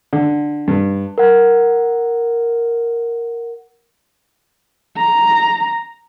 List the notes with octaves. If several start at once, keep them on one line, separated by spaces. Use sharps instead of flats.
D3
G2
A#4 F#5
A#5